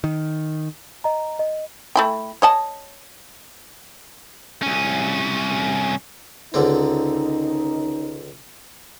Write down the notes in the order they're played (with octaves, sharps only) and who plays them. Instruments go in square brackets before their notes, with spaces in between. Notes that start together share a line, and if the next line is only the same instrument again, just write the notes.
[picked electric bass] D#3
[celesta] D#5 A#5
D#5
[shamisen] A3 E4 G5
C#5 D#5 A5
[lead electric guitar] C2 C#4
[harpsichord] C#2 D3 C4 [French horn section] D#3 C#4 D#4